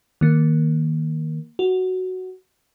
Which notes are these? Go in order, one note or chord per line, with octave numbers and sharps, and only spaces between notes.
D#3 A#3
F#4